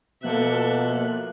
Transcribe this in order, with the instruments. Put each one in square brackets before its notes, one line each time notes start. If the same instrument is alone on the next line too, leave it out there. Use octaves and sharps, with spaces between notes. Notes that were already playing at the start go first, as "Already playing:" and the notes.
[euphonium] B2 [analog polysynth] F3 A#3 F#6 [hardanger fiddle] A4 E5